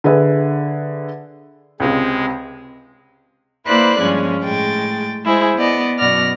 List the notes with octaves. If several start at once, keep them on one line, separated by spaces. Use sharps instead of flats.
D3 G#4 B4 E5
C#2 C3 G#3
A#3 E4 B4 C5 D5 F#6
G2 F3 G#3 C#4
A2 G#3 G5 A6
G#3 E4 G#4 C5
B3 D5 D#5
F#2 B2 B3 D5 F6 A#6